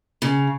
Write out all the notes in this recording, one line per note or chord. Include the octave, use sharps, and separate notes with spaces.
C#3